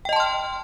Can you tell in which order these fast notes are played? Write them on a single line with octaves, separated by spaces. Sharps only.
G5 D#5 A5 C6 F6